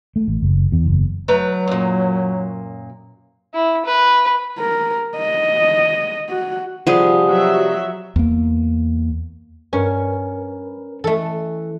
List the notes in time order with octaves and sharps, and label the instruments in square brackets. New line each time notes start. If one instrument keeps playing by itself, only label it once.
[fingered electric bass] A3
A1
F#1
E2
F#1
[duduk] F#3 [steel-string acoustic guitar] A3 B4 A#5
[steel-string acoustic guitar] F#2 A#2
[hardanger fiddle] E4
B4
[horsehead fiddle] A#4
D#5
F#4
[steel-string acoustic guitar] C3 G3 [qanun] F3 G#4 [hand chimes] F#5 D#6
[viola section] F#3 E5
[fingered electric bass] E2 A#3
[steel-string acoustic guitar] G2 [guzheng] C#4 [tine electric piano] A#4 B4
[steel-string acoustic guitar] E3 [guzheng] A3 A4